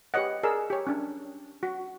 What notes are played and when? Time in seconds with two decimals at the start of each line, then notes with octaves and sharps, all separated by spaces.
0.14 G4 B4 C#5 D#5 F#5
0.43 G#4 A#4 D5 E6
0.70 G4 C#5
0.87 C#4 D4
1.63 F#4